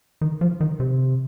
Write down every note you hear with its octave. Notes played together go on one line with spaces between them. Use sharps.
D#3
F3
D#3
C3